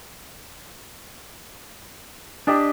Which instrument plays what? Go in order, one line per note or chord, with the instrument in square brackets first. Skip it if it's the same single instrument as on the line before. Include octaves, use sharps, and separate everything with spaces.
[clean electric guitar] D4 [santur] G4 D#5 A5